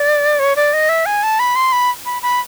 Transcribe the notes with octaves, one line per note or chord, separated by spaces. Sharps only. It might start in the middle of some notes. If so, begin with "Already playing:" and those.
Already playing: D5
C#5
D5
D#5
E5
G#5
A5
B5
C6
B5
B5
B5